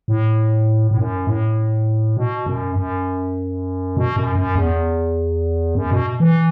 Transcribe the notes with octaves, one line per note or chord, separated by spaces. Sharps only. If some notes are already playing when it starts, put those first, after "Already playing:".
A2
A2
F#2
A2
B2
F#2
F#2
B2
F#2
F#2
E2
F#2
B2
E3